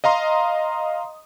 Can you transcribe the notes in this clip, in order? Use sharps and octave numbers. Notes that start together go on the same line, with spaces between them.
D#5 F5 A#5 C6 D#6